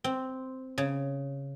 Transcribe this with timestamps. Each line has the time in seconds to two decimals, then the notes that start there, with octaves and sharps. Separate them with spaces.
0.04 C4
0.78 C#3